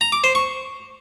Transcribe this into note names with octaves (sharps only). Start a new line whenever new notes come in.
A#5
D6
C5
C#6